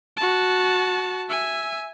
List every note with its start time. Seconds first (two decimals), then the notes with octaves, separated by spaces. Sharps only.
0.17 F#4 A5
1.29 E5 G#5